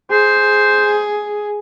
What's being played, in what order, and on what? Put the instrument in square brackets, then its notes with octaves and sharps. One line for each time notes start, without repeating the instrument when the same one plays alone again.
[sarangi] G#4 [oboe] C5